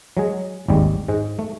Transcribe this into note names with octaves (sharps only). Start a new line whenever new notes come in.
F#3 G#3 G#4
G#1 D#2 G3 G#3
G#2 G#3
A3